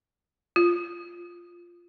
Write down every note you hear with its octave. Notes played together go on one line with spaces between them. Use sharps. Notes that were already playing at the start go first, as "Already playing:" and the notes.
F4